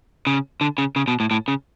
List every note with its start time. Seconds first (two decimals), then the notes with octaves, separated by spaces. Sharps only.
0.27 C#3
0.61 D3
0.78 C#3
0.96 C#3
1.08 B2
1.20 A2
1.31 A2
1.48 C#3